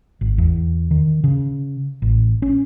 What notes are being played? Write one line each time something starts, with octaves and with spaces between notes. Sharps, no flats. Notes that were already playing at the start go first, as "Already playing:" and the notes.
G#1
E2
D#3
C#3
A1
C#4